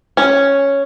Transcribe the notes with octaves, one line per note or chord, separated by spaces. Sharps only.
C#4